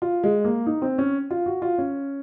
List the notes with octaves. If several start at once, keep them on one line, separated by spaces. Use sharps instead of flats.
F4
G#3
A#3
D#4
C4
C#4
F4
F#4
F4
C#4